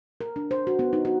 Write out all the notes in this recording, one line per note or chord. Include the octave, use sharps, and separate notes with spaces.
A#4
D4
C5
F#4
B3
D#4
F#4